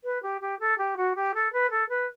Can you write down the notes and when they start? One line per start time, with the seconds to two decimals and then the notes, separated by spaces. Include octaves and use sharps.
0.04 B4
0.23 G4
0.41 G4
0.60 A4
0.78 G4
0.97 F#4
1.16 G4
1.34 A4
1.53 B4
1.71 A4
1.89 B4